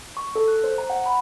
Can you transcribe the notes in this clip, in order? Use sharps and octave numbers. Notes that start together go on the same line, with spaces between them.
C#6
A4
F#6
C5
A#5
F#5
B5